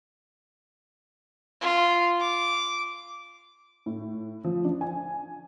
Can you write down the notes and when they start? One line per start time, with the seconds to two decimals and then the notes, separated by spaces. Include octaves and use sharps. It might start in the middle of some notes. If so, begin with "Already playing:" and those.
1.61 F4
2.20 D6
3.86 A2
4.45 F3
4.65 D4
4.81 G#5